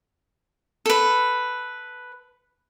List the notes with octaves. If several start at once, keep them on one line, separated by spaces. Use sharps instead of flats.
A4 B4